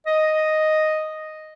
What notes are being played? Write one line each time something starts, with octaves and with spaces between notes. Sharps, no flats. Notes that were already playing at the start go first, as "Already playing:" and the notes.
D#5